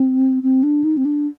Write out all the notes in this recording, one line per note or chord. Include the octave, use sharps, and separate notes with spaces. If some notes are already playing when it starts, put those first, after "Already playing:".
Already playing: C4
C4
D4
D#4
C4
D4